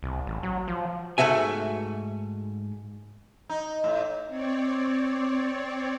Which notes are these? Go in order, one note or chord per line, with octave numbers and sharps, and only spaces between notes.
C2
A1
F#3
F3
G#2 A3 F#4 E5 G#5
D#4
A2
C4 C#5 D5